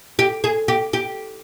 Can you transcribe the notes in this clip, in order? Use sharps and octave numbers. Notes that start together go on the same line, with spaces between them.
G4
G#4
G4
G4